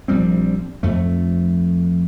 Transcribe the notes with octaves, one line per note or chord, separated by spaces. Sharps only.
A#1 F3 G3 C4
F2 A3